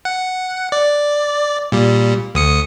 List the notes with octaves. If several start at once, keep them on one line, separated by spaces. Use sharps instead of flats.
F#5
D5
A#2 G3
D2 D#6 C#7